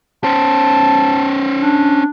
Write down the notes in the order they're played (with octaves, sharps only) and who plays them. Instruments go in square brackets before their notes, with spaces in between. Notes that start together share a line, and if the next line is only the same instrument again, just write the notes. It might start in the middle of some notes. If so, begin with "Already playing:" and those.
[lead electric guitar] C#4 C5 [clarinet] A5
[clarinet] D4